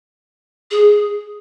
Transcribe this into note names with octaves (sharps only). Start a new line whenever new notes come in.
G#4